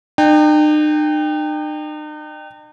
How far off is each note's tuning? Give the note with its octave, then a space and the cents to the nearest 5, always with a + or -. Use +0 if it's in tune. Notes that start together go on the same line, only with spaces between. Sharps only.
D#4 -45 G5 +15